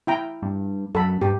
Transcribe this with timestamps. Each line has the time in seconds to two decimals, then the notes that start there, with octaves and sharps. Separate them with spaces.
0.07 E4 G5 A#5
0.43 G2
0.95 F#2 A4 B5
1.21 G2 G4